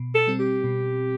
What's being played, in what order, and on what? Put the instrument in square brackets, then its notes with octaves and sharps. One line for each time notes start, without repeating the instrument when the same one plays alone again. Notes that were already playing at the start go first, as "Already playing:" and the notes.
Already playing: [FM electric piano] B2
[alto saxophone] A4
[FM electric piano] G3 C4
[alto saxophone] G4
[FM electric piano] B2